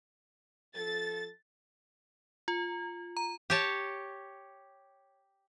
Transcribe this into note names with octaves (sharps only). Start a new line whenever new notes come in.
F3 A4 A6
F4
A#5
G4 C#5 A5